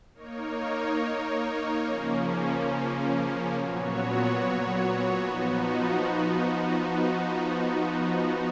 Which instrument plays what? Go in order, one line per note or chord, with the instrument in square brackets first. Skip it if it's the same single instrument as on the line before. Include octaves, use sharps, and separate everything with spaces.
[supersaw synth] A#3 D#4 A#4 C#5
C#3 F3 A#3 C#4
A#2 F#3 B3 F#4 C#5
F3 B3 D#4 F#4